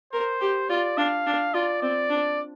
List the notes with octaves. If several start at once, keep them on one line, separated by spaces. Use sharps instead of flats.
A#4 C5
G4
F4 D5
D4 F5
D4
F4 D5
C4 D5
D4